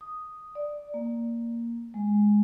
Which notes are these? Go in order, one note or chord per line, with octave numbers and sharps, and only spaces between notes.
D#6
D5
A#3
G#3